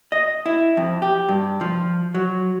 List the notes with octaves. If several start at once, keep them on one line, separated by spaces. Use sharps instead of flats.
D#5
E4
F2
G4
G2
F3
F#3